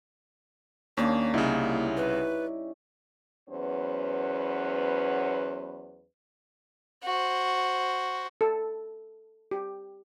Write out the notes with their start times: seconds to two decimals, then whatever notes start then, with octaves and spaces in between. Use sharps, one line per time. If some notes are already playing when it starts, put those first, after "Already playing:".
0.97 D#2 A#3 C#4 D4
1.34 C2 C#3 G3 D#4 E4
1.97 B4
3.49 E2 F#3 B3 C#4 B4 C5
7.04 F#4 C5
8.41 A4
9.51 G4